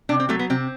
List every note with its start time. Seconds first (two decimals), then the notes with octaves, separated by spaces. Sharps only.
0.09 C3 D4
0.20 C4
0.29 F#3 A3
0.39 B3
0.50 C3 C4